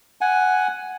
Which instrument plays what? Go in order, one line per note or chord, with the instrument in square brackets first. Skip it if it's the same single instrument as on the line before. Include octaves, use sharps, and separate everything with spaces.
[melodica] F#5 G#5